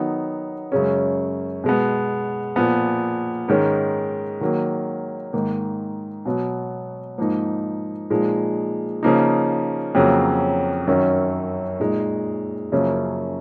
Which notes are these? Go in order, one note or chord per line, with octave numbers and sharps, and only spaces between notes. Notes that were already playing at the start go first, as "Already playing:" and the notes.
Already playing: D#3 F#3 B3 D#4
F#2 C#3 G#3 C#4
B2 G#3 B3
A#2 F3 B3
G#2 D#3 G#3 C#4
D#3 F#3 A#3
G#2 D#3 A#3
B2 F#3 B3
G#2 F3 A#3 D#4
A#2 F3 G#3 D#4
C#3 F3 A#3 D#4
F2 C#3 F#3 A#3
F#2 D#3 F#3 C#4
A#2 G#3 D#4
F#2 C#3 F3 A#3 C#4